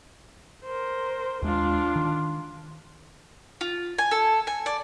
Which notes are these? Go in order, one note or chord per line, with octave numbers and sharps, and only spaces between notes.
A#4 C5
D#2 G#3 D4 F4
D#3
F4
G#5
A4
G#5
D5